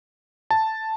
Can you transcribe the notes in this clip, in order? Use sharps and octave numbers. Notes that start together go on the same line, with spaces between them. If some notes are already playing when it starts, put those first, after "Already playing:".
A5